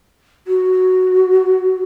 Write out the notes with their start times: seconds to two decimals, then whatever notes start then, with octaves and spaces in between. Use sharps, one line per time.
0.47 F#4